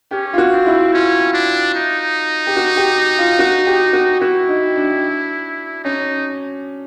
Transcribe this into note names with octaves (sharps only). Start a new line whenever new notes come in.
C#4 G4
F4
F#4
C4
E4
C#4 F4
D4
D#4
G4
F#4
G4
F4
F#4
G4
F#4
E4 F#4
D#4
D4
C#4 D#4